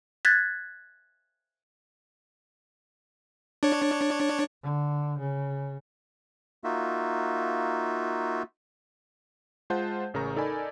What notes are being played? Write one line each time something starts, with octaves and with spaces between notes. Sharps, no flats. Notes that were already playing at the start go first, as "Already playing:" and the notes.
F#6 G#6 A6 B6
D4 C#5
D3
C#3
A#3 D#4 F4 F#4 E5
G#3 F4 C5 F#5 A5 G6
A1 C#3 A#4 A#5 C#6
D#4 A4 A#4 D5 G#5 B5